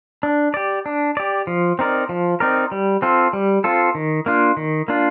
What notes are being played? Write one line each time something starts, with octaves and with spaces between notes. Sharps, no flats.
D4
G4 D5
D4
G4 D5
F3
C4 D#4 A#4 D5
F3
C4 D#4 A#4 D5
G3
C4 F4 A4
G3
C4 F4 A4
D#3
A#3 D4 F4
D#3
A#3 D4 F4